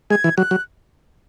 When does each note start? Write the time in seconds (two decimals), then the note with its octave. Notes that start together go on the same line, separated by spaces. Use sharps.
0.10 G#3 G#6
0.24 E3
0.37 F#3 F#6
0.51 F#3